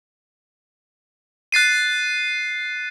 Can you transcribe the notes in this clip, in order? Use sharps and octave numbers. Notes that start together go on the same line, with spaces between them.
F#6 A6 C7 D#7